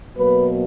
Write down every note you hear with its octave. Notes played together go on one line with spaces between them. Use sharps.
B2 F#3 A#3 B4